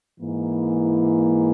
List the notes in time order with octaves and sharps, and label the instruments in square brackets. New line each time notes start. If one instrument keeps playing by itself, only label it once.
[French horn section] G#2 E3 A#3 E4